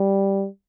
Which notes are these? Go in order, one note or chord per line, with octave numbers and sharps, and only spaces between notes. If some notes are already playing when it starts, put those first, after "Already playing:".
Already playing: G3